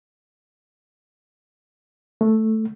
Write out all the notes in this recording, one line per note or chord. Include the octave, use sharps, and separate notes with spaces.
A3